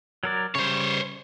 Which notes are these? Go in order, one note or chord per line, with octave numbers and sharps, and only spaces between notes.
F#3 A#4 D5
C#3 G3 C5 C#5